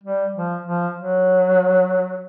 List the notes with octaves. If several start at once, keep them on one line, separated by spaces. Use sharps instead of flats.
G3
F3
F3
F#3